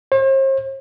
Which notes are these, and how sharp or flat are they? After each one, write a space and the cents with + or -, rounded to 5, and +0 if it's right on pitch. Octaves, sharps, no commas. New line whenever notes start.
C5 +45